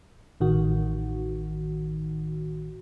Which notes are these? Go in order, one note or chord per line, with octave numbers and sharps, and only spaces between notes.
A1 D#3 F#4